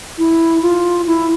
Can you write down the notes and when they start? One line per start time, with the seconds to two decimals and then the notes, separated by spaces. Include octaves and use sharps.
0.18 E4
0.62 F4
1.07 E4